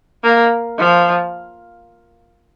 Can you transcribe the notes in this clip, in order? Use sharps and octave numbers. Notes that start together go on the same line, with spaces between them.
A#3
F3